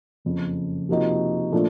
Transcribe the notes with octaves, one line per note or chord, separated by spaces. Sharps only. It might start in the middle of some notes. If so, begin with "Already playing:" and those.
F#1 F2 C#3
C3 F3 A#3 D#4 F#4
A#2 F3 A3 D4